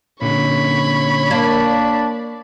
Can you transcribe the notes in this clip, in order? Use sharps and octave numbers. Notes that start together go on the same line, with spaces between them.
A#2 D3 C#4 C#5 B5
A#3 D4 D5